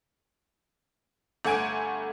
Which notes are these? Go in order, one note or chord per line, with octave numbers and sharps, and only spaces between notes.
G1 A3 F#5 G#5 G#6 D7